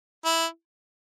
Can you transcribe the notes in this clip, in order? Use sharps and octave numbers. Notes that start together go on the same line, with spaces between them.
E4